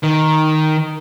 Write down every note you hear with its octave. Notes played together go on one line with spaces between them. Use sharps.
D#3